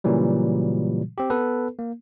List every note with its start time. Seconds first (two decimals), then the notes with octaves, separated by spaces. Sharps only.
0.04 A#2 C#3 E3 F#3 G3
1.18 C4 G4
1.30 B3 A4 B4
1.79 A#3